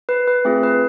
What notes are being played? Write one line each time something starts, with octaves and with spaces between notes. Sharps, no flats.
B4
B4
A3 C4 F4 G#4
B4